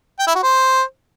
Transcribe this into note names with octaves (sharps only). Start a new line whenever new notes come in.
G5
E4
F#4
C5